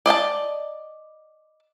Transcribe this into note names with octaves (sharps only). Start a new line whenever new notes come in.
D5 D#5 F5 A5